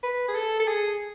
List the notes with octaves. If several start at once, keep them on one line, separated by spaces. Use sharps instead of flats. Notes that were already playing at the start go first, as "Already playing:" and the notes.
B4
G#4
A4
A4
G#4